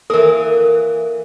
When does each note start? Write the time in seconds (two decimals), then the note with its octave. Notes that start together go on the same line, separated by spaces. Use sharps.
0.10 E3 A#3 A4 A#4